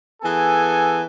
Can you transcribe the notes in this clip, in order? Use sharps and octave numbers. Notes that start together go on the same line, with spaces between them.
E3 B3 G#4 A4 G#5